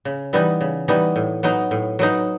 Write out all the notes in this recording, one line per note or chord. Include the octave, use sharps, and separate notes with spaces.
C#3
E3 G3 B3 D#4
C#3
E3 G3 B3 D#4
A2
F#3 B3 D#4
A2
F#3 B3 D#4